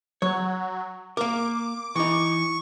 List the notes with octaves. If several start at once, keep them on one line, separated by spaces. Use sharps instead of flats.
F#3 C#5
A#3 A#4 D6
E3 D#4 C#6